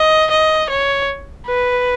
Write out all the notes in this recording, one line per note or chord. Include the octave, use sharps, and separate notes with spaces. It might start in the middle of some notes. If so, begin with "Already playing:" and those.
Already playing: D#5
D#5
C#5
B4